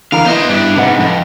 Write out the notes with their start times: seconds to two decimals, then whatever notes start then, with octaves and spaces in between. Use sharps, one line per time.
0.12 D3 E3 A#4 F5
0.26 B3 E4 C5 D#5
0.49 G2 D4
0.77 D#2 G#2 C3 B4 F#5
1.00 F2